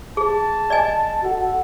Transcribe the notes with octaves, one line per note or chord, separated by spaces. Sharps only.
G#4 A5
D5 D#5 G#5
F#4 A4